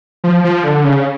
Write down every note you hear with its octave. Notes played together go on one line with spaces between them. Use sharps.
F3
F3
D3
C#3